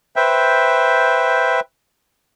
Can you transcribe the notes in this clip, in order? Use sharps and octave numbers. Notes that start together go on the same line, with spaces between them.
B4 C5 E5 G5